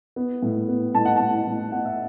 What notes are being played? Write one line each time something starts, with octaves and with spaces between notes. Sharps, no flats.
B3
A2
B3
A2 A5
F#5
A2 A5
A2
B3 F#5
E5